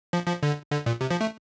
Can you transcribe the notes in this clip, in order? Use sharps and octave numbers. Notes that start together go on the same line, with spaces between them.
F3
F3
D3
D3
A#2
C3
F3
A3